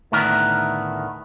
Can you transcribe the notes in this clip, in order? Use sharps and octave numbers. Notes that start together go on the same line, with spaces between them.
D2 A2 D#3 B3 A#4